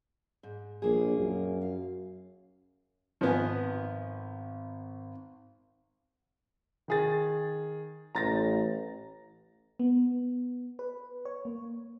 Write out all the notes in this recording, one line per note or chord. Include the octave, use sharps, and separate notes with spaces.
G#2
A#1 A#3 G#4
F#2
F5
G#1 F3 B3 G#5
D#3 G#4 A6
A1 A#5 A6 A#6
B3
B4
C#5
A#3